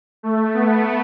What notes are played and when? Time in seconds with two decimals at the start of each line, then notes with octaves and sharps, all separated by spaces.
0.23 A3
0.54 B3